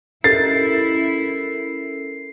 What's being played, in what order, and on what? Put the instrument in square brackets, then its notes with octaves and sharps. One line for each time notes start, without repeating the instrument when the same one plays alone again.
[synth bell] C#4 A4 A#4 [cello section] E4 [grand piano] A6 [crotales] C7